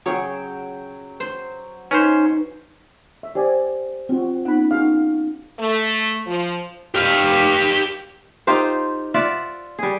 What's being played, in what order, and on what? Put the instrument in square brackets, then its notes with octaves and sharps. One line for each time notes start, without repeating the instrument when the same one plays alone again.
[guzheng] C#3 G#4 C#5 [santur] F#3 G5 E6
[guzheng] C5
[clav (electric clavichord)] C#4 C5 [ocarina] D#4 [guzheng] B4 A#5
[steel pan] E5
[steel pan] G4 D5 G#5 [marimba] C5
[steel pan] C4 F#4 [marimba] F4
[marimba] B3 C#4 D#4 [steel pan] F#5 B5
[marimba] B3 D#4 [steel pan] F#4 G#4 F5
[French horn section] A3
F3
[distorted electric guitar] G4 F5
[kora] D#4 F4 G4 C5
F4 D5 E5 F#5
G3 G#4